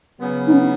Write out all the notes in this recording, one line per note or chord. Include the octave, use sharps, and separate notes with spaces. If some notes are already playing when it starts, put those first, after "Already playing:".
C#3 F#3 B3
D#4
C#4